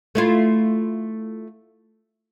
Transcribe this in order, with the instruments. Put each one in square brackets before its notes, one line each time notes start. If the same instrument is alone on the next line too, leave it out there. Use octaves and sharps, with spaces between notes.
[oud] A3 E4 F4